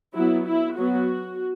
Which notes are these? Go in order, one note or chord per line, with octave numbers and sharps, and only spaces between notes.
F#3 B3 E4
E4
F#3 B3 F#4